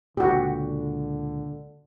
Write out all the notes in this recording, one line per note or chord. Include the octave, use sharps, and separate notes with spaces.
C#2 A#2 D3 F#4 G4